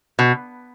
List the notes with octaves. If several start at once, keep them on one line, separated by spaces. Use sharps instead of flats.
B2